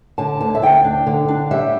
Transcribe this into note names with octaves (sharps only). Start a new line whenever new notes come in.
D3 A5
D2 A5
E5
D2 G5
D4
D3
D4
G3 E5